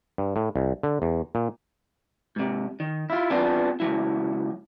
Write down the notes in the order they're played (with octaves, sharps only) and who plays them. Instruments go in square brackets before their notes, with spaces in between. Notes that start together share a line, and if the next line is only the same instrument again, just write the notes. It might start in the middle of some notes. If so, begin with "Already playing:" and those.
[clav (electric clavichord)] G2
A2
C2
D3
E2
A#2
[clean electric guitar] G#2 C3
D#3
E4 F4
B3 C4 D4 F4 G#4
C#2 B2 F#3 E4